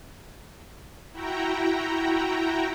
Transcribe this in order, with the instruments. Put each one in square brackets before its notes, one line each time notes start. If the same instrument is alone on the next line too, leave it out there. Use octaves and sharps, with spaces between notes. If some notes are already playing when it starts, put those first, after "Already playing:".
[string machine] E4 F#4 G5 A#5